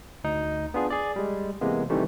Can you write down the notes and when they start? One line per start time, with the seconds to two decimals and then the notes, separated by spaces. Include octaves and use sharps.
0.24 D2 D#4
0.74 B3 D4 F4 G#4
0.90 G#4 D5
1.16 G3 G#3
1.61 C3 E3 G#3 A#3 B3
1.90 C3 D#3 E3 G3 A3